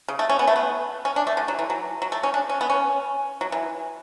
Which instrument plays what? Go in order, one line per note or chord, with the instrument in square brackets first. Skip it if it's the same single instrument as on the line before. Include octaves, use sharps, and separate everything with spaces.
[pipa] C#3
A3
C#4
B3
A3
B3
C#4
D4
A3
D3
F#3
E3
F#3
F#3
A3
C#4
D4
C#4
B3
C#4
F#3
E3